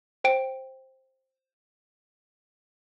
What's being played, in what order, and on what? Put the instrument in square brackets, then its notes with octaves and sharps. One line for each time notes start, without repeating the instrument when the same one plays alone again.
[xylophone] C5 G5 D7